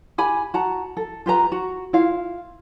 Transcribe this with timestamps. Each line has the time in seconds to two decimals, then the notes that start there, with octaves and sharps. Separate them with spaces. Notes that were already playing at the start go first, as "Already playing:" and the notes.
0.18 G4 G#5 B5
0.54 F#4 A5 A#5
0.97 A4
1.26 F4 G4 B4 A#5
1.52 F#4
1.93 E4 F4 F5